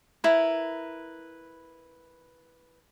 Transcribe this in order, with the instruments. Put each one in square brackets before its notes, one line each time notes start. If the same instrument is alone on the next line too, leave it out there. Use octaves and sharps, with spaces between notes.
[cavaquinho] E4 A#4 B4